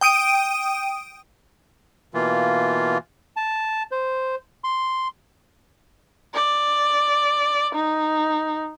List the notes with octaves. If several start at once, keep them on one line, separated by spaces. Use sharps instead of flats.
G5 D#6 D7 D#7
B2 E3 A#3 F4
A5
C5
C6
D5
D#4